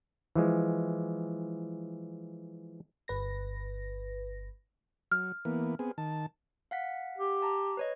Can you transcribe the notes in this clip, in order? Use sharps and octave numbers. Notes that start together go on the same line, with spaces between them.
E3 F3 G#3
G1 B4 A#6
F#3 F6
E3 A#3 B3
B3 C4 G#4
D#3 A5
F5 F#5 B6
G4
A5 A#5
B4 C#5 D#5